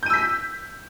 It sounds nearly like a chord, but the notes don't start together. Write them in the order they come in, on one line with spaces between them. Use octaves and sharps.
G6 D#7 E6 B6